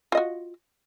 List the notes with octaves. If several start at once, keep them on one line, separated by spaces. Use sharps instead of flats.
F4 F#4 D#5